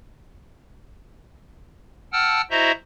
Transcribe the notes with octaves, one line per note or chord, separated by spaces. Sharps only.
F#5 G5 A5 E6 F6
E4 F#4 C5 D#5 E5 A#5